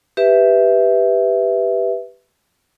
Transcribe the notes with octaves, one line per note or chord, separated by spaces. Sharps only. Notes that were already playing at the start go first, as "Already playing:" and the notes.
G4 B4 E5